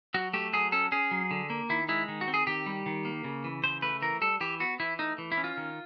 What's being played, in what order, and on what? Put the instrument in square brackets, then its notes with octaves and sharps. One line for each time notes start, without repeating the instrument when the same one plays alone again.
[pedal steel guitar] F#3 F#4
A3 G4
F#3 G#4
C#4 A4
C#4 G#4
F#3
D3
A#3
D#3 E4
G#3 E4
D#3
F#4
C4
G#4
D#3 G4
G3
D#3
A#3
C#3
E3
C#3 C5
A3 B4
E3 A#4
G3 A4
E3 G4
B3 F#4
E3 E4
A3 D#4
E3
E4
C#4
F4
D#3